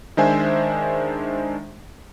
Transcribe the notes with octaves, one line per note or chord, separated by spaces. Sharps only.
D#3 G#3 D4 C5 E5 G#5